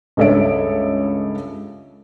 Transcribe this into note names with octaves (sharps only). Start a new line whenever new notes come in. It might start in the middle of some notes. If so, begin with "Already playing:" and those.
C#2 G2 A4 C#5 E5 D7